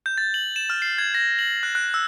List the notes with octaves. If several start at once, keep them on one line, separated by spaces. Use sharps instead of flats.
G6
A6
F#7
E7
F6
C7
G#6
A#6
F#7
F#6
F#6
E6